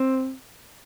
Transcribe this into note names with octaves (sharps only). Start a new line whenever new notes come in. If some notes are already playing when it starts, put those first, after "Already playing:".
Already playing: C4